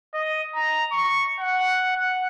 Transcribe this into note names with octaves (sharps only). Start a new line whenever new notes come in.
D#5
A#5
C#6
F#5
F#5